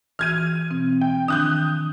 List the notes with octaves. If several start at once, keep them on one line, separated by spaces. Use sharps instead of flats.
E3 F#4 F6 G6 G#6 D#7
B2 C4
G5
D#3 F3 D4 D#6 F#6 G6